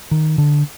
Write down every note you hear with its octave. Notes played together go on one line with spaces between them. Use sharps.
D#3
D3